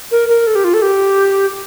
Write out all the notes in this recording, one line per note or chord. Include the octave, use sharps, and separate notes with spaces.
A#4
A#4
A4
G4
F4
A4
G4